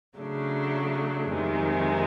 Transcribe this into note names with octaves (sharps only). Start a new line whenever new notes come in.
C#3 F#3 A3 D4
F2 C3 D#3 G#3